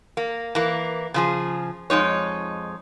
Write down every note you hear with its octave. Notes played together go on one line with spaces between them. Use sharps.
A#3
E3 A#3
C#3 F3 G#4
F2 G#3 D#4 C#5